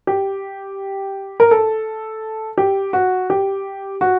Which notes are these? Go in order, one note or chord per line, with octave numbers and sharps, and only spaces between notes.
G4
A#4
A4
G4
F#4
G4
F#4